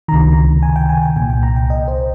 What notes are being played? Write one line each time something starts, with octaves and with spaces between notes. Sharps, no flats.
C#2 C3 D#3 A#5
G#5
G5
G#5
G#5
C2 A#2 G5
G5
A#5
G5
D#5
C5